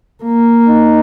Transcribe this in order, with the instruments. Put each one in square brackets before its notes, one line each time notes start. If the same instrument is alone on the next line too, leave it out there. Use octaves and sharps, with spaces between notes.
[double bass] A#3
[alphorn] D#4